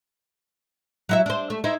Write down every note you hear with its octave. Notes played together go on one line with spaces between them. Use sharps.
F#3 E4 E5
D4 C5
A3
D#4 E4 C5